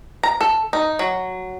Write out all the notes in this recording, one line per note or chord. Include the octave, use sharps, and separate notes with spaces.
A#5
A4
D#4
F#3